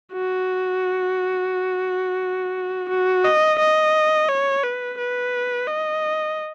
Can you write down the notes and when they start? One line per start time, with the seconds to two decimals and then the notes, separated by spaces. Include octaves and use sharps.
0.13 F#4
2.89 F#4
3.24 D#5
3.59 D#5
4.29 C#5
4.63 B4
4.98 B4
5.68 D#5